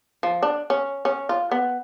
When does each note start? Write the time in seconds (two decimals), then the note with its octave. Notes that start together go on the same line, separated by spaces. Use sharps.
0.23 F3
0.43 D4
0.70 C#4
1.05 C#4
1.29 F4
1.51 B3